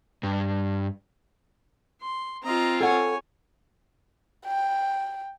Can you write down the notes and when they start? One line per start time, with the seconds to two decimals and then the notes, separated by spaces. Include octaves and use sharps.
0.23 G2
2.01 C6
2.43 C4 F4 D#5 A#5
2.80 A4 C#5 F#5 G#5
4.45 G5